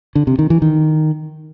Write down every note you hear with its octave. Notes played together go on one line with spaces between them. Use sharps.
D3
C3
D#3
E3
D#3